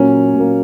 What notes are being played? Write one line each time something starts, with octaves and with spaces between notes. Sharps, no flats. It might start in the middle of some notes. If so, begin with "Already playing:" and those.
Already playing: A#2 F#3 A#3 C#4
A#2 F#3 A#3